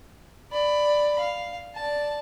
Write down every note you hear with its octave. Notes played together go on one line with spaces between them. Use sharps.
D5 B5
F5
D5 A5